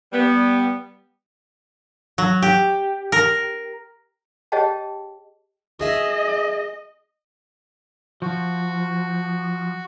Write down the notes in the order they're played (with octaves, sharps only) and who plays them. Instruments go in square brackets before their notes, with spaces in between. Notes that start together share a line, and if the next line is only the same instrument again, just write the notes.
[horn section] G3 B3
[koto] F#3
G4
A#4
[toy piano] G4 G#4 C#5 D#5 G5 A5
[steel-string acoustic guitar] F#4 G#4 E5 [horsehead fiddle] D#5
[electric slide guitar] F3 [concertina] F#4